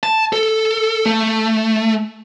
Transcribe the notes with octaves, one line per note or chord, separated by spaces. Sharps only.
A5
A4
A3